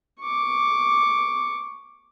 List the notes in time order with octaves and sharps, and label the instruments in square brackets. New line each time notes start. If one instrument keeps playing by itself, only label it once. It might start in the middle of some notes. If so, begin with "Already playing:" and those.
[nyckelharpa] C#6 D6